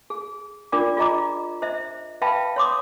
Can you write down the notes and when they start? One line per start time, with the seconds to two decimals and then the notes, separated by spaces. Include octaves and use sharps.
0.10 G#4
0.72 D4 F4 A#4 D5 D6
0.97 F4 G#4 D#5 A#5 D6
1.62 C5 D#5 E5
2.22 B4 E5 F5 G5 A5 B5
2.56 C#5 C6 D6 D#6